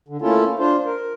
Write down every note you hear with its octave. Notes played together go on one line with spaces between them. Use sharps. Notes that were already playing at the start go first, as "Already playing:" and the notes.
D3
A3 A#3 C#4 E4 F4 A4
D4 F4 C5
A#4